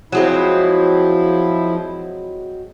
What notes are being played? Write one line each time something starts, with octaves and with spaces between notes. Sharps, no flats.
F3 F#3 G#3 C4 E4